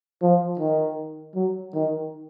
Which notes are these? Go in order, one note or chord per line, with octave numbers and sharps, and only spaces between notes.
F3
D#3
F#3
D#3